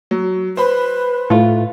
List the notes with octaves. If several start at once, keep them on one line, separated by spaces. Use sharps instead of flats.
F#3
B4 C5 B5
A2 A3 F4